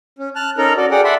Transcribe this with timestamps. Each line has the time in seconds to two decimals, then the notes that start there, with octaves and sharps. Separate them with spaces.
0.19 C#4
0.36 A5 F6 F#6
0.58 C#4 D#4 A4 A#4 A#5
0.77 F#4 A4 D5
0.91 G#4 D5 F#5 G5
1.04 D5 E5 F#5 A5 B5 C6